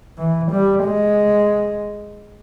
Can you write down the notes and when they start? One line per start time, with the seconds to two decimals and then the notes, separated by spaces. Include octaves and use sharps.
0.18 E3
0.52 G3
0.85 G#3